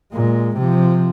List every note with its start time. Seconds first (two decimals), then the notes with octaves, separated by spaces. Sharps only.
0.13 A#2 G#3
0.57 C3 F3